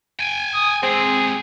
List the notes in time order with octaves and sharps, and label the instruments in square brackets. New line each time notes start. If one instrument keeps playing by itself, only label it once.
[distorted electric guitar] G5 G#5
[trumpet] D#6
[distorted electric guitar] G#3 G4 [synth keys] C4 [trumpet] G#4